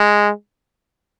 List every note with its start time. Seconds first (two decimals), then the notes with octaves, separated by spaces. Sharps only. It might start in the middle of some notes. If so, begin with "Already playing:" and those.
Already playing: G#3